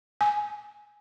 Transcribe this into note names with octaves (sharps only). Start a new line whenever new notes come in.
G#5